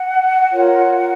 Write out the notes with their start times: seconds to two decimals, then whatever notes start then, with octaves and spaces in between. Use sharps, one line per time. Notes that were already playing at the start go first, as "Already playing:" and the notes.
Already playing: F#5
0.51 F4 A#4 C#5 F#5